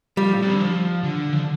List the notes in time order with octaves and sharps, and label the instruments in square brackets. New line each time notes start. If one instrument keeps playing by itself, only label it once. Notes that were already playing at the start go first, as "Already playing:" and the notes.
[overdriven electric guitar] F3 [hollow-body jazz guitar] G3
[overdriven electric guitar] A2
C3
D3
F3
D3
F3
D3